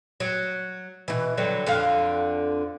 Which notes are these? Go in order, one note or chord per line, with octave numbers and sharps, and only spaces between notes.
F#3
B2 E3
D3 F#3 G3
F2 D3 F5